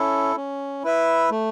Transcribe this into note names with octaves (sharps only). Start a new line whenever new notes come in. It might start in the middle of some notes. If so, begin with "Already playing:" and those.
Already playing: C#4 E4 A4
C#4
E4 B4 E5
A3